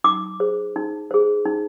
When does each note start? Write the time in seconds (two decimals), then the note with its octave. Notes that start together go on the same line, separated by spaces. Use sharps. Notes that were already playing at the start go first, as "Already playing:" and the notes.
0.04 D#4 D6
0.40 G#4 C5
0.76 D#4
1.11 G#4 C5
1.45 D#4